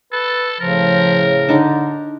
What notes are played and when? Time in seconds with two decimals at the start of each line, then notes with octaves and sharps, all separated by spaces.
0.13 A4 B4
0.60 A2 C#3 F3 A#4
1.49 D3 D4 D#4